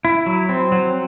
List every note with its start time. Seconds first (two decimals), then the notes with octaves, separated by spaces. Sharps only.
0.05 E4
0.26 F#3
0.49 C4
0.72 F#3